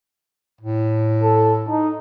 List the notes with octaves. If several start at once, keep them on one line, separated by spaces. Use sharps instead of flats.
A2
A4
D#4